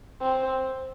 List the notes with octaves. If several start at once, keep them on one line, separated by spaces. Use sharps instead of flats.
C4